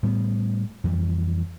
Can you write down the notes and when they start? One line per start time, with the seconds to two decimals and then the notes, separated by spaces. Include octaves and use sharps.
0.03 A2 G3 A3 B3
0.84 F2 E3 G3